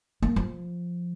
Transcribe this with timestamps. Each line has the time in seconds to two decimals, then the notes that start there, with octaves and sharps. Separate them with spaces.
0.22 A#3
0.36 F3